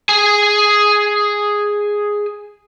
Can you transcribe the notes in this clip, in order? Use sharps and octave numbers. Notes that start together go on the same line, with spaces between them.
G#4 G#5